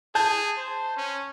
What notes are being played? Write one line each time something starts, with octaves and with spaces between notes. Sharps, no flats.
G#4 A5 G6
C5
C#4